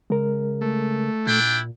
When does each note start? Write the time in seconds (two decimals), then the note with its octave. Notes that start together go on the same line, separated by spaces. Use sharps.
0.10 C#3 G#3 A#4
0.61 A3
1.27 A#2 D4 E4 G5